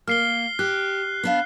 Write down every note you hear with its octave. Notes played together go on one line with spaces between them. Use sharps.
A#3 F6 C7 G7
G4 F#6
B3 D4 F5